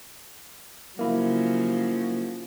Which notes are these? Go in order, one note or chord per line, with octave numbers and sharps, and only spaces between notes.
C#3 F3 F#3 A#3 E4